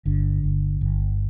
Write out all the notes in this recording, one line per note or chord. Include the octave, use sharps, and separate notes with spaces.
G1 D3
G1
G1